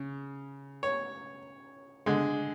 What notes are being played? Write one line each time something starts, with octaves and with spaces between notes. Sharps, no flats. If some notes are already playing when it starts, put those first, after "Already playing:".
Already playing: C#3
C#5
D3 G#3